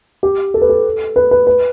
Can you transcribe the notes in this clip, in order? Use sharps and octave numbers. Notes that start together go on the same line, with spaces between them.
G4
A4
B4
A4
B4
B4
B4